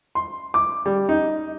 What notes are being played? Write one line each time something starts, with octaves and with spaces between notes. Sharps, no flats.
C6
D6
G3
D#4